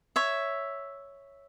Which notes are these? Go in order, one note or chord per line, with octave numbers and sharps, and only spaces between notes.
C#5 E5